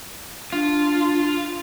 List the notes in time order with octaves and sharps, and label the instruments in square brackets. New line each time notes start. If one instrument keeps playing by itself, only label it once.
[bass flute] D4 [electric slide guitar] F4